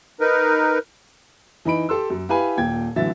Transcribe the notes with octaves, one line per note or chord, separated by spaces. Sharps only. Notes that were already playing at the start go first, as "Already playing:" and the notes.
D#4 A#4 B4
E3 D#4 B5 D7
G4 A4 C6 E6
F#2
E4 G4 B4 F5 G#5 B5
D#1 A#2 G5 G#6
A1 D3 E3 F#3 E5 A6